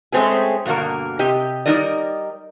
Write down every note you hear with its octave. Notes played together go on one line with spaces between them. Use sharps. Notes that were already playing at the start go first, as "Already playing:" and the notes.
G#3 A3 C4 C#4 G#4
G2 B2 D3 A#3 A#4
C3 G4 D#5
G3 B3 D#4 A#4 D5 D#5